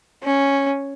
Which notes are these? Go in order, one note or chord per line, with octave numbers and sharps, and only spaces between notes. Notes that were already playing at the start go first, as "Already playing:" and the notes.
C#4